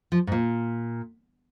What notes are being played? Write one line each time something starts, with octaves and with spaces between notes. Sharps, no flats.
F3
G#2
A#2